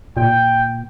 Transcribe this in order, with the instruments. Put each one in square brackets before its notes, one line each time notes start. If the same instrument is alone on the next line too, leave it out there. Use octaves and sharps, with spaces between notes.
[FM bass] A#2 [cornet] G5